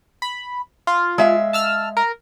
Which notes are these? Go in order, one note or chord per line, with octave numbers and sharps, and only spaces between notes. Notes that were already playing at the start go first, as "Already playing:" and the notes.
B5
F4
G#3 E5 F5
A5 E6 F6
A#4